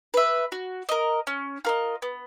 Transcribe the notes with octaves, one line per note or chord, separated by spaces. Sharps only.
B4 E5
F#4
A#4 D#5
C#4
F4 A#4 D#5
B3